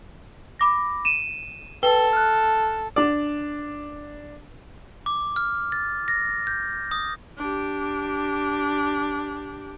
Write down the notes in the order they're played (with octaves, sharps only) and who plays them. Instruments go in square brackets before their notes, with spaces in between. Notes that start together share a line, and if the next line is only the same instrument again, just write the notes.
[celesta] B5 D6 A#6
D#7 E7
[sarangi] A4 [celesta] B4 G5 G7
[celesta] F6 F#6
[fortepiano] D4 D5
[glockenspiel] D6
F6
A6
A#6
G6
D#6
[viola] D4 G4